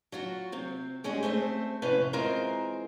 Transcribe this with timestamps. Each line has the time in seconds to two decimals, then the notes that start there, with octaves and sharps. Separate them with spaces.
0.12 F#3 F4 F#4
0.52 C3 C4
1.04 G3 G#3 C#4 F#4 G#4
1.23 A3 C4 C5 E5
1.82 F2 A2 C3 C#4 B4 C5
2.13 E3 G#3 C4 F4 A#4 C5